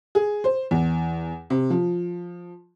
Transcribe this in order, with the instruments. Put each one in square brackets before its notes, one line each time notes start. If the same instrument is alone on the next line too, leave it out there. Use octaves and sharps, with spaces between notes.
[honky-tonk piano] G#4
C5
E2
C3
F3